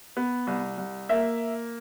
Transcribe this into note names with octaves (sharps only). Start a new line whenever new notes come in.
B3
C2
C2
A#3 E5